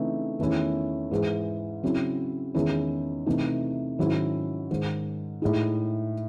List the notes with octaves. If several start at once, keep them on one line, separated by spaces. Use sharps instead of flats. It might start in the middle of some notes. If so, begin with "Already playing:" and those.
Already playing: C#3 E3 A3 C4 D#4
E2 D#3 A3 C#4 E4
G#2 E3 G#3
C#3 F#3 C4 E4
E2 D#3 G#3 C#4 E4
C3 E3 A3 D#4
G#2 D#3 F#3 C#4 E4
G#2 D#3 G#3
A2 G#3 D#4